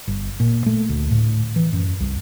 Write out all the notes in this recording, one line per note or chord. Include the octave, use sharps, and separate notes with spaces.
G1
A#2
A3
D2
A2
E3
F#2
C2